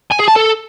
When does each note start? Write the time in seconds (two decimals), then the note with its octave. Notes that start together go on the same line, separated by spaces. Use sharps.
0.12 G#5
0.20 G#4
0.28 A5
0.36 A4